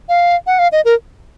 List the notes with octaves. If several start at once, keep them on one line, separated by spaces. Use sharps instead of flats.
F5
F#5
F5
D#5
A#4